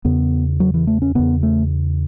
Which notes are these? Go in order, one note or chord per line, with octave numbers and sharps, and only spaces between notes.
E2 C#3 B3
F#3
E3
A3
C#4
E2 C#3 B3
A3